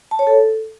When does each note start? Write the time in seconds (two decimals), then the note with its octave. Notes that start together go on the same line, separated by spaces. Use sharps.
0.11 A5
0.19 C#5
0.27 A4